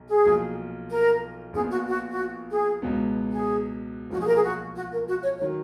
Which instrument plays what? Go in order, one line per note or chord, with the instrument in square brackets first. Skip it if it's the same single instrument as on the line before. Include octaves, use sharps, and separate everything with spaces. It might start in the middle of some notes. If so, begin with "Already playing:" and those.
Already playing: [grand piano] B1
[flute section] G#4
[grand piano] B1 A#2 F3
[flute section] A#4
[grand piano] A#1 A#2 F3 B3 [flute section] G#4
[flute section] F#4
F#4
F#4
G#4
[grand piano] C#2 B2 F#3 B3
[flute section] G#4
[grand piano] B1 A#2 F3 [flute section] F#4
[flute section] G#4
A#4
G#4
F#4
F#4
A#4
F#4
C#5
C#5
[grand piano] D#3 F#3